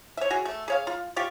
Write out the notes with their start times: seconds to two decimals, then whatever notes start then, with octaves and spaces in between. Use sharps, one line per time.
0.17 C#5 E5
0.31 F#4 G#4
0.45 A3
0.68 G#4 C#5 F5
0.87 F4
1.16 F4 G4 C#6